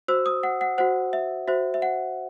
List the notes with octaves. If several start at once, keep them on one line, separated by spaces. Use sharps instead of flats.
F#4 C5 E6
D#6
F#5
F#5
F#4 C5 F#5
E5
F#4 C5 E5
E5
F#5